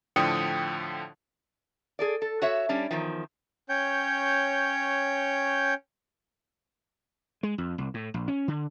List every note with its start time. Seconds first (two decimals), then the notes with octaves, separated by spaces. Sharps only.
0.16 A2 D3 F3 G5 D#6 C#7
1.99 G#4 A4 D5
2.22 A4
2.42 F#4 C#5 E5
2.69 G3 C#4 D4
2.91 E2 D#3 F3
3.69 C#4 C#5 G5 G6
7.43 G#3
7.58 F2
7.78 C2
7.94 A2
8.14 A#1
8.28 C#4
8.48 D3